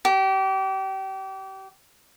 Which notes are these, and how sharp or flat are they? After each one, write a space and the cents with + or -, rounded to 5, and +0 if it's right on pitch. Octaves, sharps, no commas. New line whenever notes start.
G4 -30